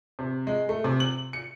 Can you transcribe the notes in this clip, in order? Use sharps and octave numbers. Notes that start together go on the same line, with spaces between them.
C3
G#3
A3
C3
F#7
C#7